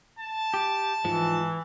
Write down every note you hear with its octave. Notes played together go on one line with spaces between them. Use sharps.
A5
G4
G#2 E3 F3 G#3